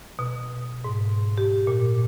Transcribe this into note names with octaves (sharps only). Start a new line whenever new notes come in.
B2
G#2
G4
A#2